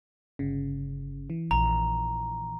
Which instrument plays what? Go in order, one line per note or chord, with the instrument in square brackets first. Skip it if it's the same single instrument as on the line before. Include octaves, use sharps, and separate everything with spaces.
[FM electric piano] G1 C#3
E3
[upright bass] A#1 [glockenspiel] A#5